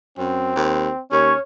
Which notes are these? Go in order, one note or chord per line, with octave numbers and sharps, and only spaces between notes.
F#2 C4
D#2
D#2 C#4 C#5